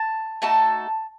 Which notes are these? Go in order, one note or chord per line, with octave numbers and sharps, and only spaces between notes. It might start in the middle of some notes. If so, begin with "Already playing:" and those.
Already playing: A5
A3 D#4 F#4 A4 A5